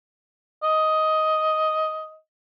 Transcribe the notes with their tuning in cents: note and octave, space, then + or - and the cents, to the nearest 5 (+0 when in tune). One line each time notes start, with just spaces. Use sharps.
D#5 +10